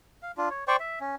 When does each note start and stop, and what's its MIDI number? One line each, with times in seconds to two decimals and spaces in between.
0.23 0.32 77
0.37 0.49 62
0.37 0.49 65
0.50 0.64 73
0.68 0.76 72
0.68 0.76 74
0.68 0.76 79
0.68 0.76 85
0.80 0.99 76
1.01 1.15 61